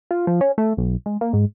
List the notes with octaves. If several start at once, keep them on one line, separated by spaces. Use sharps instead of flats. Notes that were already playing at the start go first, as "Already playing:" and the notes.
F4
F3
C#4
A3
B1
G#3
A#3
G#2